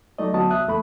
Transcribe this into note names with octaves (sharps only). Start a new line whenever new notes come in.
F#3 A3 D#4 D5 D#5
D2 F#3 B3 F#4 A5 D#6
C2 E5 D#6 F#6
E2 A3 B5